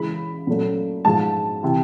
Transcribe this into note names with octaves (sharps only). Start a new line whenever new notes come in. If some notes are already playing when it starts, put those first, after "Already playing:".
Already playing: C#3 E3 G#3 B5
A#2 F#3 A3 C#4
G#2 F3 G#3 A5
C3 E3